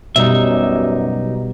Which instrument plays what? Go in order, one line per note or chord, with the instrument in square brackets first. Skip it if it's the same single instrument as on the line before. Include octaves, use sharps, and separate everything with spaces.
[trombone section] F#2 [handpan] B2 G3 [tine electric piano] F#3 D#4 [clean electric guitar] E5